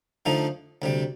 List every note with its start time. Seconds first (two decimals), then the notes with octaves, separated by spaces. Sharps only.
0.26 D3 F3 A3 D#4
0.82 D2 C3 G3